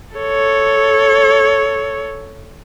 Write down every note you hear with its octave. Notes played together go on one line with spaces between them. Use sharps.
A4 C#5